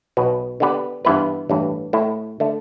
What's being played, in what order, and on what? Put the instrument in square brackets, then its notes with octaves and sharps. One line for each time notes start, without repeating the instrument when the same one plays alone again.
[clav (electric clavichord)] B1 B2 B3
D3 B3 G4 B4 D5
G2 E3 B3 E4 B4
A1 G2 E3
A2 A3 E4
D3 A3